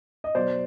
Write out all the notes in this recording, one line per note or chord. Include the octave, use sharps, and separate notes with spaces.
D#5
B2 F#3 C5 D5